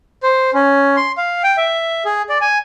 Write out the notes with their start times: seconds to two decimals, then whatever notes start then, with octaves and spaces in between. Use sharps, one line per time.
0.23 C5
0.54 C#4
0.97 C6
1.18 F5
1.44 G5
1.57 E5
2.05 G#4
2.29 D5
2.41 G#5